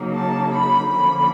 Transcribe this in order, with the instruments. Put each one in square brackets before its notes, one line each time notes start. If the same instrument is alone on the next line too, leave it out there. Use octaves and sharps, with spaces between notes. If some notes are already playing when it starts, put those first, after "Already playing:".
Already playing: [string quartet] C#3 F#3 A#3 D#4
A5
B5
D3 F3 A#3 C#4 B5